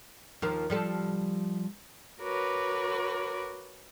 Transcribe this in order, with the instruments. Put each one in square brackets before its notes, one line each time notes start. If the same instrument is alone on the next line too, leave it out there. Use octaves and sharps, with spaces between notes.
[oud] D#2 F3 A#4
F3 G3 A4
[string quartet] F#4 A#4 B4 C#5 D6